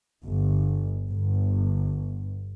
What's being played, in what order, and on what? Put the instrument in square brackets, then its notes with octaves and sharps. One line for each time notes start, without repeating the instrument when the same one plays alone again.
[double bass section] G1
G1